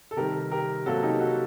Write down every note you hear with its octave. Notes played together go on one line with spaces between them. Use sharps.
A4
C3 D#3 G3 G4 A#4
G4 A#4
C3 F#3 A#3 F#4 A4
D#4 G4
F#4